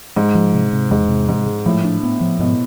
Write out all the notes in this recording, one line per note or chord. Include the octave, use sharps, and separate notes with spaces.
G#2 G#3
F3
C3
C3
E2 G#2
C3
G#2 G#3
G#3
A2 F3
D4
B3
F3
G#2 B2